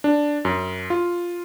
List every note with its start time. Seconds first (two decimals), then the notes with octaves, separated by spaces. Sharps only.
0.04 D4
0.45 F#2
0.90 F4